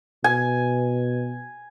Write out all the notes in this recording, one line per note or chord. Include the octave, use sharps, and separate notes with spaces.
B2 G#5